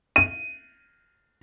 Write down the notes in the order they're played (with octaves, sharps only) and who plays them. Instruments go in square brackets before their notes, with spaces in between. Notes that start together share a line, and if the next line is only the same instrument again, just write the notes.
[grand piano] D#7